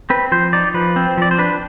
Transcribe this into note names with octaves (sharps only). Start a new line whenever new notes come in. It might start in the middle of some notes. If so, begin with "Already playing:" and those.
C4 B4
F3 C5
D#4 D5
F3 B4
C4
F3 D5
C5
D4 B4